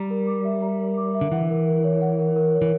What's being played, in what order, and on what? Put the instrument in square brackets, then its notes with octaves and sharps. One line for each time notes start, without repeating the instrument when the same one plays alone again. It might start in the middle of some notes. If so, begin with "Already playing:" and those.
Already playing: [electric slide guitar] G3 [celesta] A#5
[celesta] A#4
D6
E5
A#5
A#4
D6
E5
[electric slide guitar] D3
[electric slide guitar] E3 [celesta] F#5
[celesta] A#4
A#4
C#5
F#5
A#4
A#4
C#5
[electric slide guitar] E3